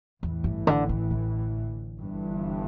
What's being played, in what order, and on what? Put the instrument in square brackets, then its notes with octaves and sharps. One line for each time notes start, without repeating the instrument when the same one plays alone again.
[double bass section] A1 A2 E3 [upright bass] E2
[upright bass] G2
D3
D3
D3
[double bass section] G1 G2 E3